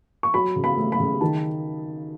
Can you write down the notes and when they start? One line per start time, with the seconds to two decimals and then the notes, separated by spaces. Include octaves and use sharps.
0.23 C#6
0.34 F#3 B5
0.56 C#3
0.64 B5
0.77 A3
0.92 B5
1.00 C#3
1.21 D#3 A5